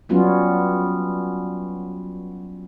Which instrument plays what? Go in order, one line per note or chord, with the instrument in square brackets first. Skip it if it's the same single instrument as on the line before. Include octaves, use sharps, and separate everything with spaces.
[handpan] F#3 G3 B3 C#4 F4 F#4